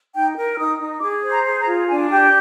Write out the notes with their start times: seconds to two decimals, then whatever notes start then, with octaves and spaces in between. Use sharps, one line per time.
0.14 D#4 G5
0.36 A#4
0.54 F6
0.58 D#4 D#6
0.79 D#4
1.01 G#4 D6
1.23 C5
1.31 A#5
1.45 G#4
1.60 A#5
1.66 F4
1.89 D4 G#5
2.10 G4 G5